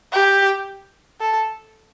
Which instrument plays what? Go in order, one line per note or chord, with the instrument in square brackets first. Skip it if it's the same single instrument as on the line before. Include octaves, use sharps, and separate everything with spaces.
[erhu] G4
A4